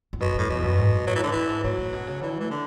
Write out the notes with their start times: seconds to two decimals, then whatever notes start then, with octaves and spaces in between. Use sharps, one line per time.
0.13 E2
0.20 F#2 B2
0.35 F#2 A2
0.49 E2 B2
0.63 F#2
0.77 G#2
0.92 G#2
1.07 A2 F#3
1.15 E3
1.21 G#2 D3
1.32 F#2 E3
1.49 G#2
1.64 A2 F#3
1.78 A2
1.93 B2
2.07 C#3
2.21 D3 E3
2.40 E3 A3
2.51 D3